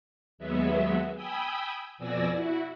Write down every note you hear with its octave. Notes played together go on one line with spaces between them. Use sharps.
D#2 F#3 G#3 B3 E5
G5 G#5 B5 D#6 E6 G6
F2 B2 D5 G#5 E6 A#6
E4 F#4